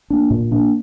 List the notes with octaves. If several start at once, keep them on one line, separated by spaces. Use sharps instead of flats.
A#3 D4
A#2
A#3 D4